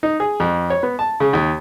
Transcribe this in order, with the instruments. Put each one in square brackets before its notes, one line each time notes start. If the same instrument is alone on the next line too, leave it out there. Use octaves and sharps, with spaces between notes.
[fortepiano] D#4
G#4
F2
C#5
B3
A5
C#3
D#2